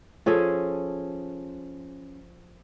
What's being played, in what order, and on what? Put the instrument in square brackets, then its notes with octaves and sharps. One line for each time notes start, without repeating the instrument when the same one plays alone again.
[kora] F3 C#4 G#4 A4